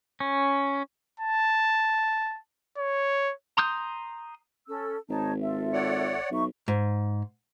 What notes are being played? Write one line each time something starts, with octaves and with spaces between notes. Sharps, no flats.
C#4
A5
C#5
A#5 C6 D#6 G6
C#4 A4 E6
G#1 D#4 C#5 A5
F4 A4 E5
C#5 D5 F#5
B1 D#4 E5 C#6
G#2